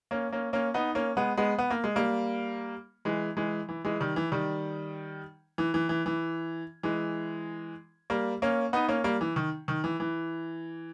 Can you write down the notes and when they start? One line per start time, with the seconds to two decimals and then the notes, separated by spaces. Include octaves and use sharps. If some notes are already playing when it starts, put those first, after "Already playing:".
0.11 A#3 C#4
0.33 A#3 C#4
0.53 A#3 C#4
0.74 B3 D#4
0.95 A#3 C#4
1.17 G#3 B3
1.37 G#3 B3
1.58 B3
1.70 A#3
1.84 G#3
1.96 G3 A#3
3.05 E3 G#3
3.37 E3 G#3
3.69 E3
3.85 E3 G#3
4.00 D#3 G3
4.16 E3
4.32 D#3 G3
5.58 E3
5.74 E3
5.89 E3
6.06 E3
6.83 E3 G#3
8.10 G3 A#3
8.42 A#3 C#4
8.73 B3 D#4
8.89 A#3 C#4
9.04 G3 A#3
9.21 E3
9.36 D#3
9.68 D#3
9.84 E3
10.00 E3